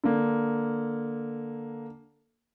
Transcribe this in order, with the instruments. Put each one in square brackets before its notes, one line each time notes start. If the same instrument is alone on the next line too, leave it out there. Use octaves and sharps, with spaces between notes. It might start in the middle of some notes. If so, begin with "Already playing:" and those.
[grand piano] D3 A#3